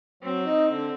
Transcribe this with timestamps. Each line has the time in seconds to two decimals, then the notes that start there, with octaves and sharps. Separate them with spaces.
0.23 F#3 C4
0.45 D#4
0.68 D3